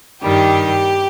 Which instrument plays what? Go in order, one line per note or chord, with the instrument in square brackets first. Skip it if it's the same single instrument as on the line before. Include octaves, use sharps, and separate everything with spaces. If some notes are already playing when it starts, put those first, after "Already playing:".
[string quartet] G2 D#3 G3 G4